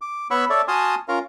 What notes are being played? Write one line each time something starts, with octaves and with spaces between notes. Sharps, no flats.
D6
B3 C#5 F#5 B5 C#6 E6
A4 C#5 D5 E5
F#4 G#5 A5 C6 D#6 F6
C#4 F4 A#4 F5 A#5